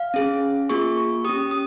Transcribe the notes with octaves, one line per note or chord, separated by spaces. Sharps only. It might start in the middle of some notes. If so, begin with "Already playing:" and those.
Already playing: F5
C#4 G#4
A#3 F4 G#4 C#6
C#6
C#4 G4 D#6
D#6